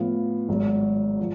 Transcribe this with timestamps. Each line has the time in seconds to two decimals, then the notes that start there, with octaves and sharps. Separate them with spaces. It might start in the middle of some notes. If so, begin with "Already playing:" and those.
Already playing: A2 F3 B3 F4
0.49 G#1 G#2 F#3
1.19 F3